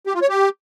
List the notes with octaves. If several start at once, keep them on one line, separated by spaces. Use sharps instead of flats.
G4
F4
C#5
G4